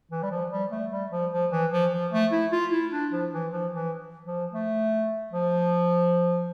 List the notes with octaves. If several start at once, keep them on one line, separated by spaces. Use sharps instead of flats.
E3
G3
F3
G3
A3
G3
F3
F3
E3
F3
F3
A3
E4
F4
E4
D4
F3
E3
F3
E3
F3
A3
F3